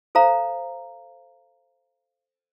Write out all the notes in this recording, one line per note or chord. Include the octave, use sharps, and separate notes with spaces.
A4 C5 F5 A#5